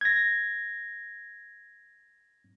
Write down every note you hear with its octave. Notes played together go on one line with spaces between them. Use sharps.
G#6 A#6